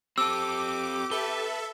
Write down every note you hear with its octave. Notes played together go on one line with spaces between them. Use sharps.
C4 G4 A4 D6 E6
A4 B4 E5 G7